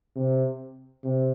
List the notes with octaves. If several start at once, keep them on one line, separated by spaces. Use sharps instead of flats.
C3
C3